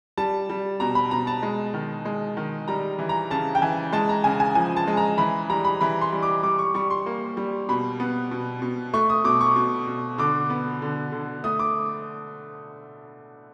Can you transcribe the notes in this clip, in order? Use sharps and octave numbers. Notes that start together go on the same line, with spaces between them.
G3 A5
G3
B2 A#5
B5
B2 A#5
A5
G#3
D#3
G#3
D#3
G3 A#5
E3
A#5
C#3 A5
G5
E3 G#5
G#3 A5
A#5
C#3 G#5
G#5
F3 G#5
A5
G#3
A#5
E3 B5
G3 A#5
B5
E3 B5
C6
G3
D6
G3 D6
C#6
G3 C#6
C6
A#3
G3
B2 B5
B3
B2
B2
A3 C#6
D#6
B2 D6
C#6
B2
B2
D3 D6
B3
D3
D3
A3 D#6
D6